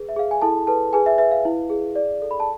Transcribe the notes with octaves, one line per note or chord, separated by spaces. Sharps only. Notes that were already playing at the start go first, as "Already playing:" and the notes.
Already playing: G#4 B4
E5
G#4 F5
G#5
E4 A4 A5
A4 B4 A5
G#4 B4 G#5
E5
B4 E5
F5
E4
G#4
D5
A4
B5
A5